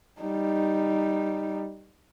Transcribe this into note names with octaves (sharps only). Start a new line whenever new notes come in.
G3 D#4